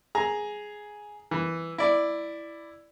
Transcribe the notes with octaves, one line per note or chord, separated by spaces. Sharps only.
G#4 A#5
E3
E4 D5